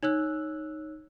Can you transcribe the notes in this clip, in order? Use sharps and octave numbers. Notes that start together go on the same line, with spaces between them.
D#4 C#5 E6 F#6